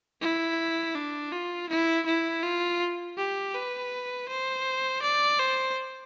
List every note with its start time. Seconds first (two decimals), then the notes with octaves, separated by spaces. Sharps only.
0.21 E4
0.95 D4
1.32 F4
1.69 E4
2.06 E4
2.43 F4
3.18 G4
3.54 B4
4.29 C5
5.02 D5
5.39 C5